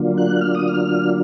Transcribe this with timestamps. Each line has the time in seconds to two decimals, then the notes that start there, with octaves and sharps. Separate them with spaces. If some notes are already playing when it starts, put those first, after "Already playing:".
Already playing: D3 F#3 A#3 D4 F4
0.17 F#6
0.41 F6
0.55 D#6
0.68 F6